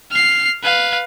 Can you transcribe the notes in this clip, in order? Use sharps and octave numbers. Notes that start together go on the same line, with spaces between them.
F6 C7
B4 F5